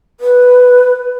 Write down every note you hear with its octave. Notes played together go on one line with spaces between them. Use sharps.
B4